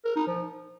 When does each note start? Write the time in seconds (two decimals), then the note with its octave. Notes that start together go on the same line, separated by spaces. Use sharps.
0.05 A#4
0.16 D#4
0.27 F3